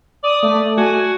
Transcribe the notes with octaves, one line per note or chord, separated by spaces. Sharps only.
D5 D#6
A3
F#4 G#5